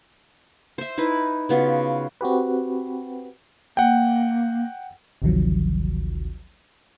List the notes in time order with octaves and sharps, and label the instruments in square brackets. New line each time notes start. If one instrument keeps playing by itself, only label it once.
[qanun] C5 E5
D#4 E4 B4
C#3 B3 F4 F#4
[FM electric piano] C4 F#4 G4 B4
[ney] A#3 [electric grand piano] F#5 G5
[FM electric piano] G#1 D2 C3 D#3 F3 F#3